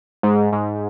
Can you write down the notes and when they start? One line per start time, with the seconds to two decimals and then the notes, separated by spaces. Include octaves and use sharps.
0.23 G#2
0.53 G#2